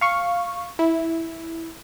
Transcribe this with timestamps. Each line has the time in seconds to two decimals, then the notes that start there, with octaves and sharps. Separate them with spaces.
0.01 F5 C#6
0.79 E4